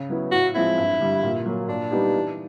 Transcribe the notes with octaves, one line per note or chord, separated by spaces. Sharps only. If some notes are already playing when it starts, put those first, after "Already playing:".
Already playing: C#3
F#3 B3 E4
A2 F#4
F3 G#3 C4 E4
G2
D3 G3
A#2
F#3 A#3
A#2 D4
G3 B3 D#4 G4
E3